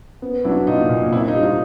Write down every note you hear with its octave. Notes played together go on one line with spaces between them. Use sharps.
B3
F#3 D4 E4
A#2 D#4 F4
A#2
C4 D4 E4
D#4 F4
G3
D#4 F4